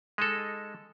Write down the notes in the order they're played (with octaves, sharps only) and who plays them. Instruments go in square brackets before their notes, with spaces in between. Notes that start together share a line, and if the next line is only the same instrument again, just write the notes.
[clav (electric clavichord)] G#3 D#4 A4